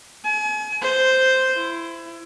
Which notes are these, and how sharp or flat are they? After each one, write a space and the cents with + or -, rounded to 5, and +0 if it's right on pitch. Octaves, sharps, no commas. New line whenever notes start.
G#5 +35
C5 -5
E4 +20